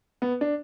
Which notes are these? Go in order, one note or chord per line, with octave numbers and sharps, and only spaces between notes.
B3
D4